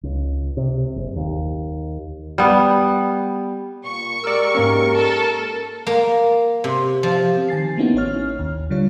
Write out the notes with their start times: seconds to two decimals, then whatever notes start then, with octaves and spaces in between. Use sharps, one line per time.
0.03 C#2
0.57 C3
0.96 F#1
1.16 D#2
2.38 G3 B3
3.85 A#2 C#6
4.24 G#3 F#4 G4 A#4 D5 E6
4.55 G#2 A#3 C#4
4.94 A4
5.87 A#3
6.64 C3
7.03 F3
7.49 D#3 G#5 A6 C7
7.77 A#3 B3 C#4 D#4 E4 F#4
7.94 A1 C#4 C#5 F6
8.39 D#2
8.70 D3 G3 F4 C#5